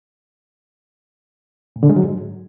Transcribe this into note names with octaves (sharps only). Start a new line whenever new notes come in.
A2
D3
G#3
F#3
G#2